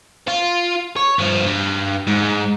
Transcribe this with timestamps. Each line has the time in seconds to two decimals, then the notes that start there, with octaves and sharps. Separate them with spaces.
0.28 F4
0.96 C#5
1.19 G2 F3
1.46 G2
2.07 G#2